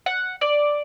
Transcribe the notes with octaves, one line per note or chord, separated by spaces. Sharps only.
F#5
D5